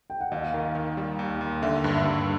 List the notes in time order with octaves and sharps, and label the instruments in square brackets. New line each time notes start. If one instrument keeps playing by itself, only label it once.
[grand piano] G5
F#5
[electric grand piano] D#2 [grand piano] D#5 F5
[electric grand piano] D#3
D#3
G3
D#2
D#2
[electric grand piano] D3 [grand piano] E5
[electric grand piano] G2
[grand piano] E5
[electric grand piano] G2